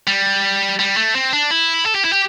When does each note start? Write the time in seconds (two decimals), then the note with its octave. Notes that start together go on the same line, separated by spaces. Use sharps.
0.07 G3
0.79 G3
0.97 A3
1.15 C4
1.33 D4
1.51 E4
1.86 A4
1.95 G4
2.04 E4
2.12 G4